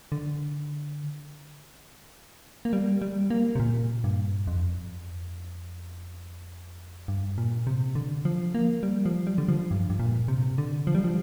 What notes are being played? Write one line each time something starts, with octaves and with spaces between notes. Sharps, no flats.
D3
A#3
G3
G3
A#3
C3
A#2
G2
F2
G2
A#2
C3
D3
F3
A#3
G3
F3
G3
D3
F3
G2
G2
A#2
C3
D3
F3
G3
F3